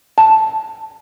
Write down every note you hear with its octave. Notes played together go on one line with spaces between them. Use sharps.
A5